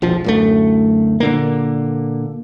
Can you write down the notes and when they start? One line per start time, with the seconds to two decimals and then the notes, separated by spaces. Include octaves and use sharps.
0.02 E1 A#1 F3
0.24 D1 F#2 A3
1.20 A#2 D3 A#3